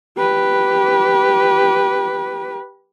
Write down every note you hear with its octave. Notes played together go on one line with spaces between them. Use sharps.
G4 B4